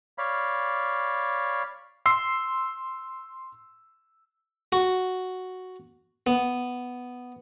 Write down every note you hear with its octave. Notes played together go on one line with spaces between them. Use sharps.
C#5 D5 F5 B5
C6 E6 C7
F#4
B3